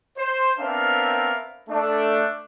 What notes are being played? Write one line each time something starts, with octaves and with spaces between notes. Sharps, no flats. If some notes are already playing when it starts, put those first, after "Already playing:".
C5
B3 C4 D4 A#4 E5 F5
A3 D4